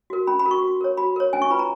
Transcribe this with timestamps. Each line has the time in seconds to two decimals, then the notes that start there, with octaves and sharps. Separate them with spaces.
0.10 F#4 A#4
0.27 C#4 B5
0.39 B5
0.45 F#4 A#4
0.51 C#6
0.62 F#4
0.81 A#4 C#5
0.97 F#4 B5
1.16 A#4 C#5
1.33 C#4 G#5
1.42 C#6
1.50 F4 B4 B5
1.59 A#5